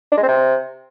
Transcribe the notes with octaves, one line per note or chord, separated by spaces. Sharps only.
D4
G#3
C4
C3